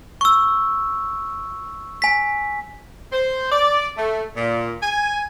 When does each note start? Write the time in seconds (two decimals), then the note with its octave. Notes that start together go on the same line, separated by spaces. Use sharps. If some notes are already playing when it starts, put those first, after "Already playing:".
0.21 C#6 E6
2.02 G#5 B6
3.12 C5
3.51 D5
3.97 A3
4.35 A#2
4.81 G#5